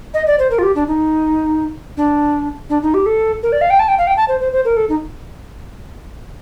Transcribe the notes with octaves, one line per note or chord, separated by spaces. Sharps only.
D#5
D5
C5
A#4
F4
G4
D4
D#4
D4
D4
D#4
G4
A4
A#4
D5
F5
G5
A5
G5
F5
G5
A5
C5
C5
C5
A#4
A4
D#4